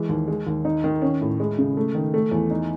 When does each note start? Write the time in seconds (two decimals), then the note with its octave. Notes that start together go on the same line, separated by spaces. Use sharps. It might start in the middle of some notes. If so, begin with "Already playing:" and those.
Already playing: E3 G#3
0.09 D#2
0.28 G#3
0.47 D#2
0.65 D#4
0.84 D#3
1.02 C#4
1.21 A2
1.40 G#3
1.58 C#3
1.77 A3
1.95 D#3
2.14 A3
2.31 E2
2.51 D#4